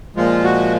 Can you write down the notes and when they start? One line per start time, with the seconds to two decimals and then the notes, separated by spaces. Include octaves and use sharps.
0.16 A#2 F3 G#3 F4
0.44 F#4